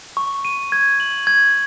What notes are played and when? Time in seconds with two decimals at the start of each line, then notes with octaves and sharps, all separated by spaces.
0.17 C#6
0.45 D#7
0.72 G#6
1.00 F#7
1.27 G#6